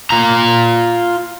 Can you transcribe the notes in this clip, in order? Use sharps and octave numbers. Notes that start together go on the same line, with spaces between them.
F4 A#5